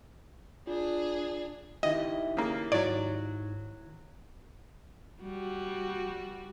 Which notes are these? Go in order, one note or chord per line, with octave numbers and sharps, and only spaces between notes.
D4 F4 G#4
D#3 E4 G4 D#5 E5
C#3 A#3
G#2 F#3 C#5 D5
G3 F#4